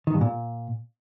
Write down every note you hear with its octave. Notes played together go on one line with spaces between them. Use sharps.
D#3
G2
A#2